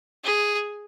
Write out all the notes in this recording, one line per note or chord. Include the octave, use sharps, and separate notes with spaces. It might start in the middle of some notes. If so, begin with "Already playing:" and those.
G#4